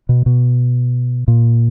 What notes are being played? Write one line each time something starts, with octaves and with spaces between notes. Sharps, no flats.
B2
B2
A#2